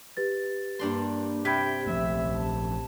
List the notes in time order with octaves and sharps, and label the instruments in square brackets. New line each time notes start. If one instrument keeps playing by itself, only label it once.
[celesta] G4 B4 A6
[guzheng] G2 D4 C6 [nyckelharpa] A#3
[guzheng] C3 [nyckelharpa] G5 [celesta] B5 G#6 B6
[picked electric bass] A#1 F3 A3 [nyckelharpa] E5
[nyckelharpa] A5